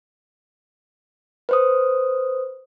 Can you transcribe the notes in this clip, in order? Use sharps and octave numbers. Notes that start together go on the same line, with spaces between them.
B4 C5 D#6